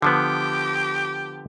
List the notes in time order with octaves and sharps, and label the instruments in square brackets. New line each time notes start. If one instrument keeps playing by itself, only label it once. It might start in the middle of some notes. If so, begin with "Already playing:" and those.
[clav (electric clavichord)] D3 F3 B3 [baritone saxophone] G4